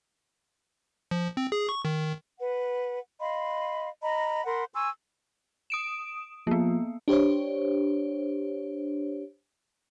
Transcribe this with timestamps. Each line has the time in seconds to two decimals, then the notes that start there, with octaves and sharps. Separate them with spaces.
1.11 F3
1.37 C4
1.52 G#4
1.69 C#6
1.85 D#3
2.40 B4 F#5
3.20 D#5 F5 B5 C6
4.02 D#5 A#5 B5
4.45 A#4 F#5 B5 C6
4.74 G#5 C6 C#6 E6
5.70 D#6 D7 E7
6.47 F3 A#3 B3
7.08 D4 G4 C5 C#5